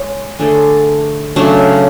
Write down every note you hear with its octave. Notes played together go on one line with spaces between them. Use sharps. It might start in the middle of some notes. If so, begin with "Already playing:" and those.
Already playing: G#3 C#5
D3 A3 D4 G#4
C#3 F#3 A3 D4